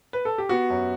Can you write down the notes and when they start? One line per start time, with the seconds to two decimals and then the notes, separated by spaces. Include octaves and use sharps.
0.13 B4
0.25 A4
0.38 G4
0.49 B3 F#4
0.70 F#2